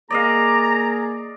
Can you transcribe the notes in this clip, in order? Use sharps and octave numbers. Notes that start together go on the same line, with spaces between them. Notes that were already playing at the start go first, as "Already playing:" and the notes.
A#3 G#4 D5 D#5 F5 A#5